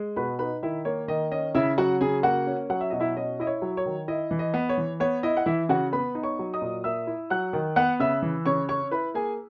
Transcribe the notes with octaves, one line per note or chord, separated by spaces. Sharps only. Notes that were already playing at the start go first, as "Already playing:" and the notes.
Already playing: G#3
B2 B4 B5
D#4 B4 B5
D#3 E4 E5
A#3 C#5
D#3 D#5
C#4 D#5
C#3 E4 E5
F#3 F#4 F#5
C#3 G#4 G#5
A#3 F#4 F#5
C#4
F#3 F#5
E5
B2 D#5
E4 E5
C#4 D#5
E4 D#5
C#5
F#3
C#5
D#3
E4 D#5
E3
D#5
B3
C#5
E3
B3 C#5
E4 D#5
F#5
E3 E4 E5
C#3 F#4 F#5
B3 B4 B5
D#4
C#5 C#6
F#3
D#5 D#6
A#2
A#3 E5 E6
E4
F#3 F#5 F#6
D#3
B3 F#5 F#6
C#3 E5 E6
E3
C#3 C#5 C#6
C#4 C#5 C#6
E4 B4 B5
A#3 G#4 G#5